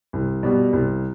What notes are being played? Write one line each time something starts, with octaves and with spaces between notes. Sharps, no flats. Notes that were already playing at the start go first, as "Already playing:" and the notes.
C2
B2 G3
C2